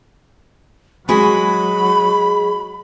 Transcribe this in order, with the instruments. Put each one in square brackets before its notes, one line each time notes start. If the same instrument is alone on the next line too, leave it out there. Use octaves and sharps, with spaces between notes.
[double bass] F#3 [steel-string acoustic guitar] G#3 F#4 G#4 [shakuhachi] B5